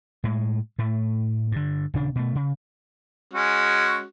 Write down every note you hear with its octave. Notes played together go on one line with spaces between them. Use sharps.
A2 G#3
A2 A3
G2 D3
D#1 C#3 D4
B2 A3
C#3
G#3 C#4 F#4